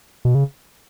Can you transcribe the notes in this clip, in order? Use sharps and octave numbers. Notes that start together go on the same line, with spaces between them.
B2
C#3